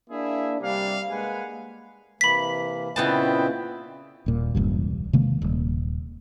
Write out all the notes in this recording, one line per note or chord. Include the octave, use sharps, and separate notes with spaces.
A#3 D4 E4 G#4 E5
C3 G3 A#3 D4 F5
G#3 A#3 B4 F#5 G#5
C3 E3 A#3 B5 B6
A#2 C#3 B3 C4 E4 D#5 G5 A5
D#1 A#2
E1 C#2 G2
C3 D#3 G#3 A#3
D#1